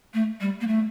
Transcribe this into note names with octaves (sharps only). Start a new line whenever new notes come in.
A3
G3
A#3
A3